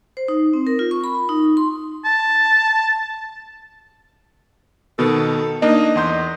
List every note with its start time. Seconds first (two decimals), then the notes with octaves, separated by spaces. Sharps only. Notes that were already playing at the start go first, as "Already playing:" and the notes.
0.17 C5
0.28 D#4
0.53 C4
0.67 A#4
0.79 F4
0.91 C#6
1.04 B5
1.29 D#4
1.57 C6
2.05 A5
4.99 B2 D#3 B3 A4
5.62 A#3 D4 D#4 D#5
5.96 E2 C6 G6